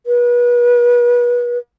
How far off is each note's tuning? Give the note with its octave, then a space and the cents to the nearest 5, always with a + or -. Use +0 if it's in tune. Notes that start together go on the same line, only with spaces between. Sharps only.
B4 -35